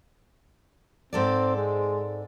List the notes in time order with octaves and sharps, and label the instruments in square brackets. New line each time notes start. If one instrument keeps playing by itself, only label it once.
[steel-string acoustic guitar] G#2 A4 D5 [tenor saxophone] C4
[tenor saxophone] G#3